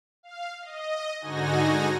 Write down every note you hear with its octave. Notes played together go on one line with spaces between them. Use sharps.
F5
D#5
G#2 D3 D#4 F#4 G#5 A#6